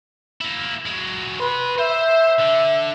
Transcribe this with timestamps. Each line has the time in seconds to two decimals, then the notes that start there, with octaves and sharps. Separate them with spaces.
0.41 A#3 E4
0.86 F#3 G#3
1.40 G4 B4 C6
1.79 C5 E5
2.39 D3